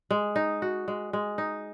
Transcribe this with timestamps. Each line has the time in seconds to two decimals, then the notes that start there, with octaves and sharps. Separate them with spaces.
0.11 G#3
0.36 D#4
0.62 F#4
0.88 G#3
1.13 G#3
1.38 D#4